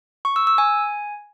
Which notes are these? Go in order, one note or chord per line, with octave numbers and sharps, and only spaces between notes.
C#6
E6
E6
G#5